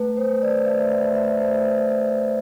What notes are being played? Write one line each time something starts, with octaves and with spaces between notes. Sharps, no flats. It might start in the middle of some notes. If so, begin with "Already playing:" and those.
Already playing: A3 B4
C5
A3
D5
A3 E5
F#5
A3
E5
A3 C5